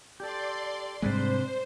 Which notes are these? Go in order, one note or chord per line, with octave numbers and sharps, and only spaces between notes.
G4 A4 D5 C6
G#2 C3 G3 G#3 D4 B4 C5